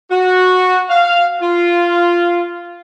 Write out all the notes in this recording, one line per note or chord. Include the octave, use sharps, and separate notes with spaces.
F#4
F5
F4